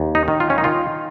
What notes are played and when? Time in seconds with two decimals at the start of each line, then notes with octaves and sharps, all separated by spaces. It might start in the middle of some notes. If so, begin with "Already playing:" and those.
Already playing: D#2
0.15 D#4
0.28 D#3
0.40 F4
0.50 C#4
0.58 D#4
0.64 D#3 F4